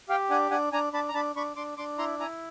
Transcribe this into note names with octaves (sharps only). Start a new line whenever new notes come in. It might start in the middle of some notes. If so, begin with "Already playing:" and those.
G4 F5 G5
D4 F#5 G#5
D4 F#5 G#5
D4 G#5 A#5
D4 A5 B5
A#5
D4 A5 B5
D4 B5 C#6
D4 C6 D6
D4 C6 D6
E4 A#5 C6
E4 G#5 A#5